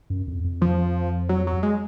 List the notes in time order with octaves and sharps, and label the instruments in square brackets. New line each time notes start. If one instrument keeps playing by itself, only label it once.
[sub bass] F#2
F2
F2
[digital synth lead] F3
F#3
F#3
G#3